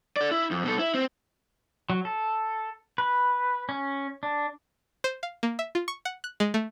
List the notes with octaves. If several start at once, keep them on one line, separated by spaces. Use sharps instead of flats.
A4 D5
E4
F2
B2 A4
E4
C4
F#3
A4
B4
C#4
D4
C5
F5
A#3
E5
F4
C#6
F#5
F#6
G#3
A3